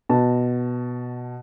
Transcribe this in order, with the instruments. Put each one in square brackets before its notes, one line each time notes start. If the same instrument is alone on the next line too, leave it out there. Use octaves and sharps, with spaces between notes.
[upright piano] B2 B4 A5